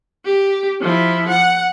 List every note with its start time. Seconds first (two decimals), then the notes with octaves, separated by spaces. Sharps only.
0.25 G4
0.81 F3 E4
1.29 F#5